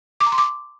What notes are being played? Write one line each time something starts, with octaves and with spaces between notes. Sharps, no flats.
D6
A#5
C6
D6